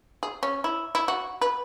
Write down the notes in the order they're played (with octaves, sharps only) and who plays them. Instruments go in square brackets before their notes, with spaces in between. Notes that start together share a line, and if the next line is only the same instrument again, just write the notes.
[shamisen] G#4
C#4
E4
E4
F#4
B4